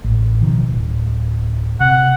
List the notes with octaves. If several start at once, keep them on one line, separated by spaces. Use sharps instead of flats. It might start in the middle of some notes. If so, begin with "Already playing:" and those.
A1
B2 D#3 F3
D1
C3 F#5